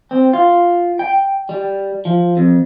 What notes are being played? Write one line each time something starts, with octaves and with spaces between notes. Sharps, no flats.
C4
F4
G5
G3
F3
F2